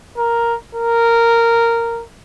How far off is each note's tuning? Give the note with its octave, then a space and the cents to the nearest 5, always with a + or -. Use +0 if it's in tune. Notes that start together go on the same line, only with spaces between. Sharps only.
A#4 +5
A#4 -10